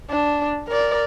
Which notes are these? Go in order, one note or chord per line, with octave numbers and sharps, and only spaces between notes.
D4
A#4 D5